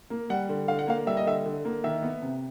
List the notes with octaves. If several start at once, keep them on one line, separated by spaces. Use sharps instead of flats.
A#3
G3 F#5
D3
D3 F5
F#5
A#3 F5
G3 E5
D#5
D3 E5
D3
A#3
D#3 E5
B3
C3